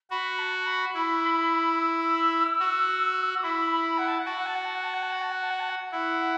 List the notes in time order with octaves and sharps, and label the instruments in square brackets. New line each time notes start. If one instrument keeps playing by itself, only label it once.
[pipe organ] F#4 [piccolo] B5
[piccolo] A5
B5
[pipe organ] E4
[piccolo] E6
E6
[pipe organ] F#4
[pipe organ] E4 [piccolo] B5
[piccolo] B5
F#5
A5
F#5
[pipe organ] F#4 [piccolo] A5
[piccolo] F#5
A5
F#5
A5
F#5
A5
F#5
A5
F#5
A5
F#5
A5
F#5
A5
F#5
[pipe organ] E4 [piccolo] F#5